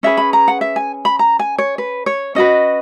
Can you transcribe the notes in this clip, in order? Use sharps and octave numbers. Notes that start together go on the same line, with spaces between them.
C#4 G#4 B4 E5
B5
A#5
F#5
E5
G#5
B5
A#5
G#5
C#5
B4
C#5
C#4 F#4 B4 D#5